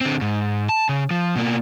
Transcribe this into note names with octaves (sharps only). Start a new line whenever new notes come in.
D3 C4
G#2
A5
C#3
F3
B2 A#3